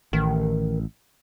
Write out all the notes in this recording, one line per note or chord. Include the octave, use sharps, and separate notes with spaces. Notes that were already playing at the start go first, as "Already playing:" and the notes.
A1 D#3